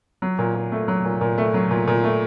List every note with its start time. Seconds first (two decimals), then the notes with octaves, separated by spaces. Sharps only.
0.22 F#3
0.39 A#2
0.55 A#2
0.72 A3
0.88 F#3
1.05 A#2
1.21 A#2
1.38 A3
1.54 F#3
1.71 A#2
1.87 A#2
2.04 A3